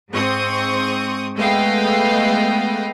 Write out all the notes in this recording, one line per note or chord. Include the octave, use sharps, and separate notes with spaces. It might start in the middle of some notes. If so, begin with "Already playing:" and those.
G#2 C4 C#6 D#6
G#3 A3 B3 D#5 F5 G5